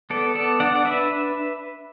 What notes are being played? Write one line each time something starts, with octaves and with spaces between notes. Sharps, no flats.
B3 A4 D5
B3 A4 D5
D4 D5 F#5
D5
D4 B4 E5